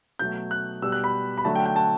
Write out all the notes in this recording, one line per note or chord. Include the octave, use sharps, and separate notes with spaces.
B2 F#3 A3 G6
F#6
B2 G3 E6
F#6
B5
B5
D3 F#3 A3 A5
G5
G5
A5